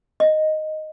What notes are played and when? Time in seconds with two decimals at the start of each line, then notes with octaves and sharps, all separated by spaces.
0.20 D#5